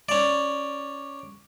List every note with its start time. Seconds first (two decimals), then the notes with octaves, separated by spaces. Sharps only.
0.09 C#4 D5